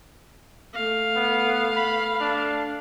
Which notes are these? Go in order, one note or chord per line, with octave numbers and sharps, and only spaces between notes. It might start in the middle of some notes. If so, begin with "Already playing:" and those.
A3 F5
B3
B5
D4